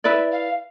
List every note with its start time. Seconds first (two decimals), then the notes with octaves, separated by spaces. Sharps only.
0.04 E4 B4 D5 E5
0.32 F5